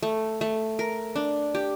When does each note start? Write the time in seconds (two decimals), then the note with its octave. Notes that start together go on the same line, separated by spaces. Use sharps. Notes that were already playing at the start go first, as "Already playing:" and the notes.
0.03 A3
0.41 A3
0.79 A#4
1.16 D4
1.55 G4